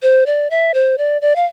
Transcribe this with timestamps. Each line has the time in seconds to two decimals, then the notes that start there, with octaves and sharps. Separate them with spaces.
0.02 C5
0.26 D5
0.50 E5
0.74 C5
0.98 D5
1.22 D5
1.36 F5